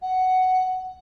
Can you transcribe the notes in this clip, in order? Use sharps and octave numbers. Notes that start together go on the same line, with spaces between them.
F#5